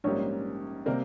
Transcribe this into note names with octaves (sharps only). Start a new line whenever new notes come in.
A#1 G#2 G3 A#3 C#4 C#5
C3 G3 A#3 C4 A#4